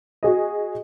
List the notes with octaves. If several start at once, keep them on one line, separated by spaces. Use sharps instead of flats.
F#4 G#4 D#5